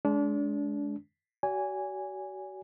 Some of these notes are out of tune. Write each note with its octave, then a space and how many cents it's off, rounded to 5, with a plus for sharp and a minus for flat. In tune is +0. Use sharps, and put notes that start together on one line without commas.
G#3 +20 D4 -30
F#4 +35 D5 -45 G#5 -10